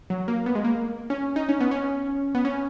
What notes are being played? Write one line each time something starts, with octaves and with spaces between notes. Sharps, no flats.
F#3
A#3
B3
G#3
A#3
C#4
D#4
C#4
B3
C#4
B3
C#4